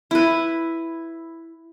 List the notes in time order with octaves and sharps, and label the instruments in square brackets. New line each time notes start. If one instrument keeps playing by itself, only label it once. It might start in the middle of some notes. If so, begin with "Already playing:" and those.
[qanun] E4 B4